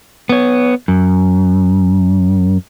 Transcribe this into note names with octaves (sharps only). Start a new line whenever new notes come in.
B3 C#5
F#2